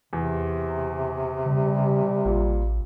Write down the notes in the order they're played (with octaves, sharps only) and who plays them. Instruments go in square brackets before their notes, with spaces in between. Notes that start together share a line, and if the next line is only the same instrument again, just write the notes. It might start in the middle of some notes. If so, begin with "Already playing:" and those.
[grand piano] E2 [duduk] C3
[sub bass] C#3 [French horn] G3
[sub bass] A1 [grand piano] A#2